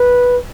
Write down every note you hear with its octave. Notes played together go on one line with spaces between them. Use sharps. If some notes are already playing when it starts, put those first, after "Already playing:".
Already playing: B4